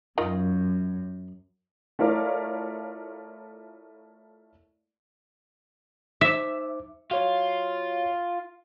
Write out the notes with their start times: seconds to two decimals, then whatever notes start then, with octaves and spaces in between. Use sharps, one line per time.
0.18 F#2 D#3 F4 D#5
1.99 A3 E4 F4 A#4 C#5 D5
6.21 D#4 C5 E5 D6
7.11 F4 F#4 C#5